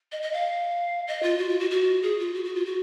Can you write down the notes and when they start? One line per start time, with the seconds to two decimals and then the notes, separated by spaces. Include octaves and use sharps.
0.12 D#5
0.22 D#5
0.33 F5
1.08 D#5
1.23 F4
1.38 F#4
1.49 F4
1.60 F#4
1.71 F#4
2.03 G#4
2.19 F4
2.34 F#4
2.45 F#4
2.55 F4
2.66 F#4